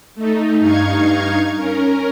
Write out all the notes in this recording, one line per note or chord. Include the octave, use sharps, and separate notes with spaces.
A3 D#4
G2 D#4 F5 C#6 G#6
C#4 A#4